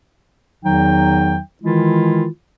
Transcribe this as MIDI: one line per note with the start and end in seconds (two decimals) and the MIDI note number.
0.64 1.38 40
0.64 1.38 51
0.64 1.38 54
0.64 1.38 63
0.64 1.38 79
1.63 2.26 51
1.63 2.26 52
1.63 2.26 56
1.63 2.26 64
1.63 2.26 65